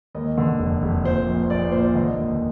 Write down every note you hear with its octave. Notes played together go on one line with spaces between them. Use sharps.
D#2 D#5
D3
F1
F1
A#2 C5
A#1
C5
A#1 D5
C5
A#2 C5
D5
D3 D#5
D#2